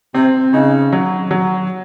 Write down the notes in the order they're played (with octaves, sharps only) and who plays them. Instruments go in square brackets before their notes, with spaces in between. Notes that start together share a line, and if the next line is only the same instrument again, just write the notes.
[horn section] C3 [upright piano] C4
[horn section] C#3 [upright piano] D#4
[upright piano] F#3
F#3